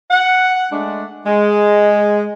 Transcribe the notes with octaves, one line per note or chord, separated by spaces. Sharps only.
F#5
G#3 A3 D4
G#3